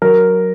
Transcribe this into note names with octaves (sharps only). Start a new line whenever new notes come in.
F#3 A#4